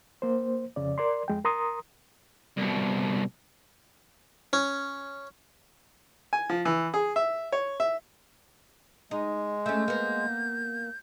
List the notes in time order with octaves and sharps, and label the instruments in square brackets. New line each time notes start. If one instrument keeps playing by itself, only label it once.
[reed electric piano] A#3 C5
F2 C#3 D5
A#4 D5 C6
F2 G#3 G5
A#4 A#5 C6 D#6
[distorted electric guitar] C2 B2
[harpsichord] C#4
[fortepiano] G#5
F3
E3
G#4
E5
C#5
E5
[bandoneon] G#3 [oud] D#4
[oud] A3 C#4 [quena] G6
[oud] A#3 B3